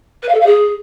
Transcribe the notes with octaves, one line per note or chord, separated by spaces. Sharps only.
B4
F5
A4
F5
G#4